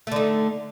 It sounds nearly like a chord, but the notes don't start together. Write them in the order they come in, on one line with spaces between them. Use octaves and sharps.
A3 D3 D#4